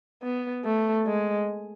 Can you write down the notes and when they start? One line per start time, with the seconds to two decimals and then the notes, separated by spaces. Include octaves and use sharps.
0.23 B3
0.64 A3
1.06 G#3